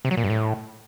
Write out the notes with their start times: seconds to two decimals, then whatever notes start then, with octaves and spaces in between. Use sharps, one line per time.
0.05 C3
0.11 F#3
0.17 A#2
0.24 G2
0.30 A2